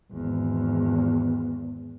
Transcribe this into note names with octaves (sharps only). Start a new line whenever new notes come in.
G#1 E2